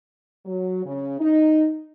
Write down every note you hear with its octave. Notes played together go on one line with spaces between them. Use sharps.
F#3
C#3
D#4